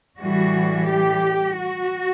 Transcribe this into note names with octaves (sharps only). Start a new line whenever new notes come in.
A2 E3 G3 F#4
G4
F#4